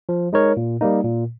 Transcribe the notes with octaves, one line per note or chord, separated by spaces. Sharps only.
F3
G#3 D#4 A#4 C#5
A#2
G3 A#3 D#4
A#2